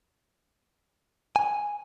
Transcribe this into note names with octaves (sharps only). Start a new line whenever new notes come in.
G#5